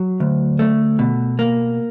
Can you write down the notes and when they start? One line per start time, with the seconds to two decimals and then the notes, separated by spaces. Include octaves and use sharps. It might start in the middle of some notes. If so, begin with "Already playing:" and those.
Already playing: F#3
0.20 D2
0.59 A3
0.99 B2
1.39 A#3